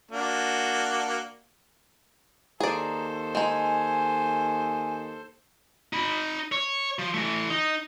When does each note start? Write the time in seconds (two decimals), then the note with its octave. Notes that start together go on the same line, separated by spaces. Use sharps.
0.11 A#3 D4 F#4
2.60 D#2 G#4 A4 C5 D5 A#5
3.35 G#3 D#4 G#5
5.93 D#4 B5
6.52 C#5
6.99 F3
7.14 E3 A3
7.50 D#4